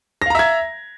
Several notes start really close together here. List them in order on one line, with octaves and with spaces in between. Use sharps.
A#6 F5 A#5 E5 G#6